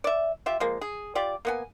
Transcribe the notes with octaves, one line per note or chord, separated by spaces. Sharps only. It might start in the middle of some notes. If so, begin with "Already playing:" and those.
D5 E5
F4 G4 E5
F3 G#3 A#3
G#4
F4 G4 D5
A#3 B3 G#5